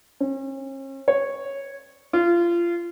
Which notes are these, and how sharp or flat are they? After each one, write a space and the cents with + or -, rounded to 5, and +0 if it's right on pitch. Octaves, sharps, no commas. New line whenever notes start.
C#4 -40
C#5 -10
F4 -25